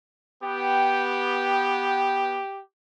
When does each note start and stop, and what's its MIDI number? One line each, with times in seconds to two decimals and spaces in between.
0.43 2.40 59
0.43 2.61 67
0.43 2.40 79